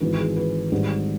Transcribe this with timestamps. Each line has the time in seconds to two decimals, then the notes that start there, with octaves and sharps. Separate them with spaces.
0.01 G#1 G#2 E3 B4
0.18 G#4
0.36 B4
0.72 G#1 G#2 G3 G4